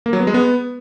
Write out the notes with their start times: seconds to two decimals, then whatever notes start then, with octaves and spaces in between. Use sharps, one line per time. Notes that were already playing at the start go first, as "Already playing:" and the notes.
0.06 A#3
0.13 F#3
0.20 B3
0.27 G#3
0.34 B3